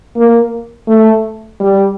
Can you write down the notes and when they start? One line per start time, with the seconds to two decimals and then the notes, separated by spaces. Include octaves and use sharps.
0.16 A#3
0.88 A3
1.60 G3